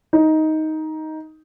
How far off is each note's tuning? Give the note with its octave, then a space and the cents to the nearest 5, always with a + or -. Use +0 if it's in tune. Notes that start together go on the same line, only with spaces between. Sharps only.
D#4 +10